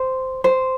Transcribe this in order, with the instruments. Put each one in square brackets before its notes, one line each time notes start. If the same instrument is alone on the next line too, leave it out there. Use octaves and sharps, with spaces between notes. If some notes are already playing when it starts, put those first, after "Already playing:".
Already playing: [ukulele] C5
C5